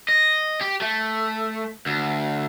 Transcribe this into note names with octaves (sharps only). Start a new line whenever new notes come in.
D#5
G4
A3
D2